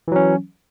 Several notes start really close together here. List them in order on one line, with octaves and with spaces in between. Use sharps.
E3 F#3 C#4